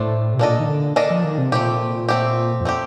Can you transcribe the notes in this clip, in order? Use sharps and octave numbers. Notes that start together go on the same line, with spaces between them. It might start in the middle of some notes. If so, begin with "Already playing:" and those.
Already playing: A2 A3 D4 A4 C5
C3
A#2 A#3 D4 A4 D#5
D#3
D3
A#3 D4 A4 D#5
F3
D#3
C3
A#2 A3 C4 G4
A3 C4 G4
F2
A3 C4 G4